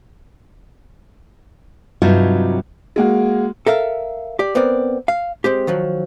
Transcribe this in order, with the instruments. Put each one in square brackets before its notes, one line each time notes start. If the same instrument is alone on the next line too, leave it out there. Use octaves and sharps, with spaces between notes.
[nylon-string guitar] G2 C3 F#3 D#4 F4 F#4
[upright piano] G#3 A#3 F#4
[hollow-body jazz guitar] A4 A#4 E5 F5
G4 D5
B3 C4 A#4 D5
F5
G#3 C4 G4
D#3 F3 F#3